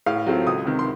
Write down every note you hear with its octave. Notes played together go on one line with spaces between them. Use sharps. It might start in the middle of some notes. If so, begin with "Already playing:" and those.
A2 F5
F#3 A3 C4 F4
C#2 D#6
C3 D#3
C6